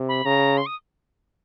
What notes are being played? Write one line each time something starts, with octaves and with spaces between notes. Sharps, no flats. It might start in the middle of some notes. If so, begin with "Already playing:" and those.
Already playing: C3
B5
C#3 A#5
C6
D#6